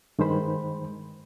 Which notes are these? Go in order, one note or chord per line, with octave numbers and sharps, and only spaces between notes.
G2 D#3 G#3 C5 B5